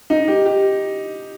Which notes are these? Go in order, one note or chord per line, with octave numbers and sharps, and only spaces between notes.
D#4
G4
G4